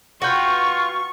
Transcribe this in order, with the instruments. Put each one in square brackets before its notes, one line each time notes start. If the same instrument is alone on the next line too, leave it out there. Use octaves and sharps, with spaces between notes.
[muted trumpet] F4 [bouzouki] F#4 B4 G5 [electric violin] C#6